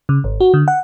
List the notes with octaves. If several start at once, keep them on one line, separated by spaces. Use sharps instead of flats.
C#3
G#1
F#4
D3
F#5